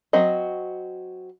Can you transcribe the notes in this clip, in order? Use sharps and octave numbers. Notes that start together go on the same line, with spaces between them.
F#3 C4 F#4 D#5